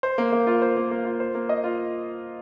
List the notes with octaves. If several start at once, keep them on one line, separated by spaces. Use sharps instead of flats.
C5
A#3
A#3
F4
C5
A#3
A#3
F4
C5
A#3
D#5
F4